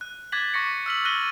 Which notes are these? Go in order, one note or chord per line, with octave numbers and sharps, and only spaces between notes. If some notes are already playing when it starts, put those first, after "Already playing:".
F#6
D6 F#6 G#6 A6 B6 F#7
C#6 D6 A#6 B6 C#7
E6 F6 B6 F#7
F#6 A#6 D#7 G7